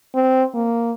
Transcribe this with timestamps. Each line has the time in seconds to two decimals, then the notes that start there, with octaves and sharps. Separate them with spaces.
0.15 C4
0.54 A#3